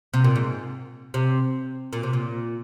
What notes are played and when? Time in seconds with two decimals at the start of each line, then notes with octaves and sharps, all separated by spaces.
0.14 C3
0.24 A#2
0.36 G#2
1.14 C3
1.93 A#2
2.03 C3
2.13 A#2